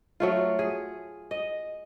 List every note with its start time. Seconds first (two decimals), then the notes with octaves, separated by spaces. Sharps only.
0.20 F#3 A3 F4
0.59 G#4
1.31 D#5